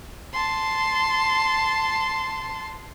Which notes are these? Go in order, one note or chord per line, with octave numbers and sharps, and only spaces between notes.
A5 C6